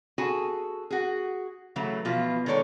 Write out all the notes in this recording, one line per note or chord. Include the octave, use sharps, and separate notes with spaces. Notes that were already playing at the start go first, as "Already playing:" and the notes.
F#4 G#4 A4 G#5
F#4 G#4
C#3 E3 F#3 A3
B2 E3 F3 F4
D#3 G#3 A4 C#5 D5